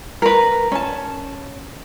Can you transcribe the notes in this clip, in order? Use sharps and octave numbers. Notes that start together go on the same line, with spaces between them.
A#4 B4
C#4 A5